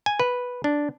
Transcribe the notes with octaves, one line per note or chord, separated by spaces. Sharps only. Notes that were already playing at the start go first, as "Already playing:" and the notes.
G#5
B4
D4